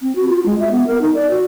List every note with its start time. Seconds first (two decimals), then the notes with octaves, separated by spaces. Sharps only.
0.02 C4
0.15 F#4
0.29 F4
0.46 G#3
0.60 E5
0.71 B3
0.87 A#4
1.01 D#4
1.15 D5
1.30 F#4